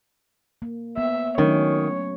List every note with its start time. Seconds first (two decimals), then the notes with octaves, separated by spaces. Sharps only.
0.62 A#3
0.98 B3 E5
1.38 D#3 F#3 A3 C#4 C#5